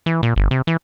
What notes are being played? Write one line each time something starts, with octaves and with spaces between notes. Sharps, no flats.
E3
A#2
G1
C3
E3